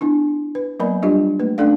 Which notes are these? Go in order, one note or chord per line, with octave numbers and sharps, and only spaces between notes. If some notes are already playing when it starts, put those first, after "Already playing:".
B3 D4 E4
B4
F#3 A#3 B3 A#4 D5 B5
G3 D4 F4 G4 D#5
A3 A#3 B4
A3 C#4 D4 A4 D5 F5